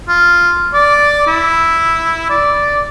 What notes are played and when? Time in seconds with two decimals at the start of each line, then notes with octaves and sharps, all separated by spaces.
0.08 F4
0.74 D5
1.27 E4
2.30 D5